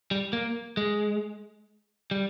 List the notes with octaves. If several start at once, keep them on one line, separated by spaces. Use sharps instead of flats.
G3
A#3
G#3
G3